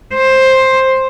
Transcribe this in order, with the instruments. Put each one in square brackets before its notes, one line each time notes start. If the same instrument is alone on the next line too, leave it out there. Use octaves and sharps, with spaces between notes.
[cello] C5